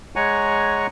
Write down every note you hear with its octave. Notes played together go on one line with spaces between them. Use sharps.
G#3 C#5 F#5 G#5 A#5 C#6